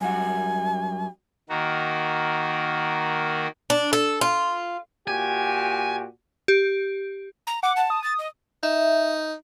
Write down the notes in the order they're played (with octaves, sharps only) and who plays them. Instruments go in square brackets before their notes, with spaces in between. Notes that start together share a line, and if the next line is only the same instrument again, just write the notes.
[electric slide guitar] F#2 G3 F#4 [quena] G#5
[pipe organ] D#3 A#3 F#4
[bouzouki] D4
A4
F4
[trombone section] A#2 F#4 G4 [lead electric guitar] G#5
[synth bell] G4
[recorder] A#5
[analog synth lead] F#5 [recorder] D6
[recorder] A5
[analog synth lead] D#6
[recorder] A6
D#5
[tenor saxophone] D#4 [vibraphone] E5